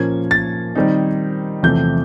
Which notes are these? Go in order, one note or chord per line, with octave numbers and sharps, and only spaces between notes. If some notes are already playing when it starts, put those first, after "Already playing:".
Already playing: A#2 F3 A#3 C#4 G#6
A6
D#3 G3 C4 D#4
E2 C3 F3 A3 G6